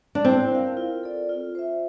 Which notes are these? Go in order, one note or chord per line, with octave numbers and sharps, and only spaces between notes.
D4
C4 E4
A#4 F5
F4
A4 D5
F4
C5 E5